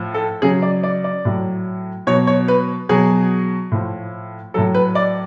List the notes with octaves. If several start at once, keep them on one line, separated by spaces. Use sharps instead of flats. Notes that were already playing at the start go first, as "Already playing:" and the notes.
Already playing: A2 F3
A4
C#3 F#3 G#4
D5
D5
D5
A2 F#3
B2 F#3 C#5
C#5
B4
B2 F#3 G#4
A2 F3
A2 F#3 A4
B4
D5